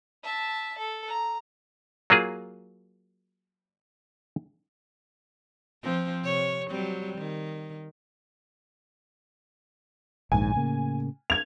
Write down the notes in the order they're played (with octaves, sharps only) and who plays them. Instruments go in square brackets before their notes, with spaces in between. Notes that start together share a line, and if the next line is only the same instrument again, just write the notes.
[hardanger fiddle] E5 A5
A4
A#5
[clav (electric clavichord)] F#3 A#3 F4 G#4
[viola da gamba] F3 C4
C3 C#5
F#3 G3 C4
D#3
[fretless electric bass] A#1 D#2 G#2 [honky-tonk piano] G#5
[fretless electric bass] A2 C#3 A#3
[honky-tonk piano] G#6 F7